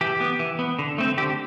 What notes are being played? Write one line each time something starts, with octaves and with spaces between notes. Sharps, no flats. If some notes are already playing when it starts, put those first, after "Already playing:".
E3 G4
B3
E3
B3
D3
A3 C4
D3 G4